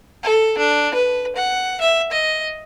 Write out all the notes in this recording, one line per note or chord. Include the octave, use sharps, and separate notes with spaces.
A4
D4
B4
F#5
E5
D#5